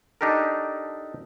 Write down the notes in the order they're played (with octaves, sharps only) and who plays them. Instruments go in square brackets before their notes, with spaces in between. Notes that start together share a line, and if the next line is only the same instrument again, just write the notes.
[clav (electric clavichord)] D4 D#4 G4 A4 A#4